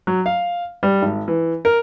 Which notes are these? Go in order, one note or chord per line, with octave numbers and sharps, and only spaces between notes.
F#3
F5
G3
G#1
E3
A#4